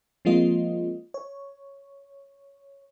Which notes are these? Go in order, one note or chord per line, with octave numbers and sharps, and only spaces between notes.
F3 G#3 A#3 C4 F4 D#5
C#5